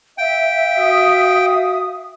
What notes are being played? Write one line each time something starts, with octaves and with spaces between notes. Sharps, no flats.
E5 F5 G5
F#4 D#6